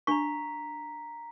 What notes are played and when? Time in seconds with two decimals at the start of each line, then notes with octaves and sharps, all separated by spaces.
0.07 D4 A#5 C#6 B6